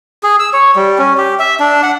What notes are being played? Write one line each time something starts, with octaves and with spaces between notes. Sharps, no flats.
G#4
E6
C#5
G3
C#4
G4
E5
D4
F#5